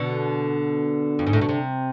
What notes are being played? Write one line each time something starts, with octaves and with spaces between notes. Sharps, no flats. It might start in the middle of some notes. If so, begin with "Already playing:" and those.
Already playing: B2 D3
F2
G#2
A2
B2
C3